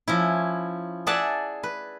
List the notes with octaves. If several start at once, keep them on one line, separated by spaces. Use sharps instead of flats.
F3 C#4 E4
G#4 D5 E5 F#5 A5
B4